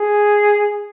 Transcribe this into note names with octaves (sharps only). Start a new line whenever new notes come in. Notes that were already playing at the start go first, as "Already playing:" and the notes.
Already playing: G#4